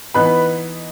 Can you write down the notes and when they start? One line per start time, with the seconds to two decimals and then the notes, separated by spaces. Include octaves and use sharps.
0.14 E3 B3 D#4 B4 B5